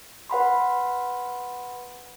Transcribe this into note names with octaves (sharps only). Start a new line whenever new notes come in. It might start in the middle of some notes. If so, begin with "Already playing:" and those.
B4 F#5 B5 C6